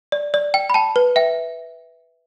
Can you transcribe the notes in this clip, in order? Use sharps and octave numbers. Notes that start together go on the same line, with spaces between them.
D5
D5
G5
B5
G5 A5
B4
E5 G5